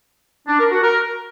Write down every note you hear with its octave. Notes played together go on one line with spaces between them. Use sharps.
D4
A#4
F#4
A#4